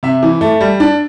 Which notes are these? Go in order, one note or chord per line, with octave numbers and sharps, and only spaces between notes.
C3 E5
E3
A3
G3
D4